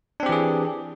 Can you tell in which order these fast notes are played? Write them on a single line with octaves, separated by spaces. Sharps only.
D4 C4 G4 E3 G#4